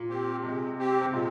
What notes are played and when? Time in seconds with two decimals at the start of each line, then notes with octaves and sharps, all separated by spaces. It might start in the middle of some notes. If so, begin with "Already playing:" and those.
Already playing: A#2
0.09 C4 G4
0.43 C3 G#3
0.78 C4 G4
1.01 C3
1.13 A#2 G#3